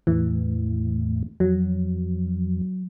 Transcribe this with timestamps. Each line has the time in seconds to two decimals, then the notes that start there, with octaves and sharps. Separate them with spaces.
0.07 E2 A2 E3
1.40 F2 F#3